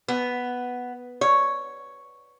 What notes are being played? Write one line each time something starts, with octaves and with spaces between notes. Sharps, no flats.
B3
C#5